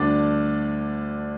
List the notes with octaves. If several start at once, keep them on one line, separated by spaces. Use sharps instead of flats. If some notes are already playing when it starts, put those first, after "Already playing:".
Already playing: D2 D3 G3 D4 D5